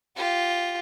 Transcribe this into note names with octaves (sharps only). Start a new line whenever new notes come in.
F4 G4